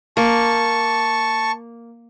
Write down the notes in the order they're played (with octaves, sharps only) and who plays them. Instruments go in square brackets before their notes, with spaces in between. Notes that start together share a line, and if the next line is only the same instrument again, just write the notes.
[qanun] A#3 [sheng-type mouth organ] A5 C#6